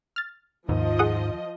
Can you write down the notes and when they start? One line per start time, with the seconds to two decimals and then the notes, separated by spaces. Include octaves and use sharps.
0.16 F6 A6
0.69 D#2 G#2 F3 D#5
0.99 G#4 F#5 D#6